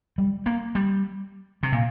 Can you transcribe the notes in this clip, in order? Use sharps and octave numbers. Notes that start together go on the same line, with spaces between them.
G3
A#3
G3
C3
A#2